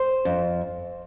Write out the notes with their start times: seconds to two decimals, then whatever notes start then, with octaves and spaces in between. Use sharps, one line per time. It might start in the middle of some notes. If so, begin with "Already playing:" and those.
Already playing: C5
0.25 F2